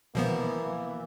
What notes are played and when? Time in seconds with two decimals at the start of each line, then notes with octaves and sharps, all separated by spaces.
0.15 B2 E3 F3 A#3 B3